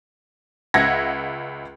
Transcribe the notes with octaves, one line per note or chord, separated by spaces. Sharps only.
C#2 E5 F#5 G#6 A#6